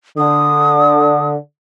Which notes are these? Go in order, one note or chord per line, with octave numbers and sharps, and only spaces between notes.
D3 D#6